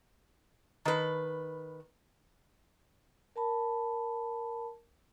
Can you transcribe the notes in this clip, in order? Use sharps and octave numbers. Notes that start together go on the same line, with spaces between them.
D#3 B4
A#4 A5 B5